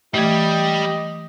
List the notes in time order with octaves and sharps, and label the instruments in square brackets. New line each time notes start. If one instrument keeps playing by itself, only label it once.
[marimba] E3 A3 [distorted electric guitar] G3 [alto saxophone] G4 [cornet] D#5